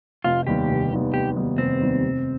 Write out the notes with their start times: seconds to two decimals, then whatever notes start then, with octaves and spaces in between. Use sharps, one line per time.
0.24 F1 F4
0.47 D#2 D#3 G3 B3 G4
0.69 F1
0.92 D#2 D#3 G3 B3
1.14 F1 G4
1.37 D#2 D#3 G3 B3
1.58 F1 C4
1.80 D#2 D#3 G3 B3
2.03 F1